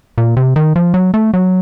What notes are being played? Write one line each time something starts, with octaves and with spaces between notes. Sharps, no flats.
A#2
C3
D#3
F3
F#3
A3
F#3